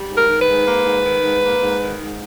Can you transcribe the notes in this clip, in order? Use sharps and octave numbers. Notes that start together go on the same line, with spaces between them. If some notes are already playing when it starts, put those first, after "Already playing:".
Already playing: G3
G#2
A#4
D#3
B4
G#2
A#3
G#2
D#3
G#2
A#3
G#2
D#3
G#2